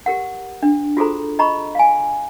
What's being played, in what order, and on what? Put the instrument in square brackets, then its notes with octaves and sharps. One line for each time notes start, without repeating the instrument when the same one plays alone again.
[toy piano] G4 A#4 F#5
D4
F4 F#4 G#4 A4 C5 A#5
D#5 A#5 B5 C#6
F5 G#5